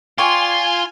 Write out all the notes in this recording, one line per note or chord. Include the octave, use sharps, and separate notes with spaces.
F4 D5 G5 G#5 C6 C#6